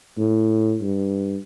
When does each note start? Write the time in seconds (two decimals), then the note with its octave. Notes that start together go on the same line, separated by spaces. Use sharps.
0.18 A2
0.82 G2